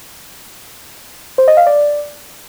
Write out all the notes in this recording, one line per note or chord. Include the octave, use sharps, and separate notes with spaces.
C5
D#5
F5
D5